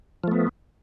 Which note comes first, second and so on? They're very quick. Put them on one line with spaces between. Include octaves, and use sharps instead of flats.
F3 A3 B3